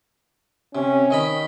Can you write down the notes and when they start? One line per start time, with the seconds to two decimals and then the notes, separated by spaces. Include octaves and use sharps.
0.75 C3 C#4
1.10 D#3 D#5 B5